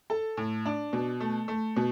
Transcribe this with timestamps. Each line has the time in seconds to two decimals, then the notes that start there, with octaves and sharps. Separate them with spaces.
0.10 A4
0.37 A2
0.66 D4
0.93 B2
1.20 A3
1.48 A3
1.76 B2